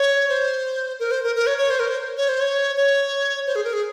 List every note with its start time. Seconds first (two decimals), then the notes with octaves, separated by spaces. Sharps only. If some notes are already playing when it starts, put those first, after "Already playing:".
Already playing: C#5
0.29 C5
1.00 A#4
1.11 C5
1.24 A#4
1.36 A#4
1.47 C#5
1.58 C#5
1.70 C5
1.79 A#4
1.88 C5
2.17 C#5
2.29 C5
2.40 C#5
2.77 C#5
3.47 C5
3.56 G#4
3.64 A#4
3.73 G#4